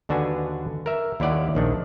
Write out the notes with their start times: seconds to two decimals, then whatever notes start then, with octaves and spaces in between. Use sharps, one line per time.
0.09 D#2 D3 D4 F#4 B4 G#5
0.86 A#4 E5
1.20 D#2 E4 C#5 D5 F#5
1.55 A#1 D#3 D4